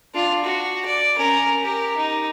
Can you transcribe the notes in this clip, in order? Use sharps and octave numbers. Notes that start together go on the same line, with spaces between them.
D4 F4
F#4
D5
C#4 A#4
G4 A#4
D#4